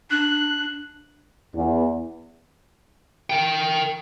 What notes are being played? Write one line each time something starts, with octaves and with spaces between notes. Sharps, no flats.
D4 F#6
E2
A#4 G5